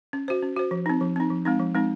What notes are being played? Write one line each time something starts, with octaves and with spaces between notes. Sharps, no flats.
C#4
F#4 C5
C#4
F#4 C5
F3
C4 D#4
F3
C4 D#4
F3
G#3 C4 D#4
F3
G#3 C4 D#4